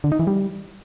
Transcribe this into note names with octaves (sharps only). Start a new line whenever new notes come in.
D3
D#4
E3
G3